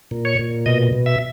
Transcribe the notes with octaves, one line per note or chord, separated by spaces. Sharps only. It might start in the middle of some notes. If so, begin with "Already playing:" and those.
A#2
C#5
A#2
B2 D#5
B2
E5